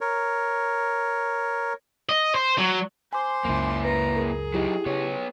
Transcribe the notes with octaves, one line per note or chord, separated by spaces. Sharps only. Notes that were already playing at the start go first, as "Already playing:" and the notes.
A#4 C#5
D#5
C5
F#3
C5 G#5 C6 D6
C#2 F#2 A#3 E4
B4 A#5
G#4 A#4
F#3 D#4 E4 G4
C#3 B3 C#5